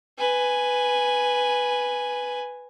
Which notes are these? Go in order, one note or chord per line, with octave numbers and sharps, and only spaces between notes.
B4 G#5